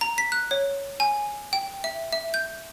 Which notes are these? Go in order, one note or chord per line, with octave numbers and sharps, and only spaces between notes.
A#5
B6
F#6
C#5
G#5
G5
E5
E5
G6